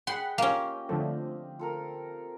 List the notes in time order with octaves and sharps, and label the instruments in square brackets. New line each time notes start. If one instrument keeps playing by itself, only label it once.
[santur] G#4 D#5 G5 [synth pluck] F#5 B5 [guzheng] C6
[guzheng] A#3 C#4 [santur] F4 G4 D#5
[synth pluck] D3 F3 A3 [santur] C4
[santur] F4 A4 A#4